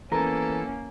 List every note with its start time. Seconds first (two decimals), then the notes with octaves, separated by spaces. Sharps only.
0.12 E3 A#3 B3 C#4 A4 A#4